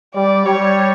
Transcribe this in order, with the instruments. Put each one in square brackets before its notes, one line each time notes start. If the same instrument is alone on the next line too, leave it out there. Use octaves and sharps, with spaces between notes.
[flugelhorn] G3 [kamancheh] D5
[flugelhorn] G3 [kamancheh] C#5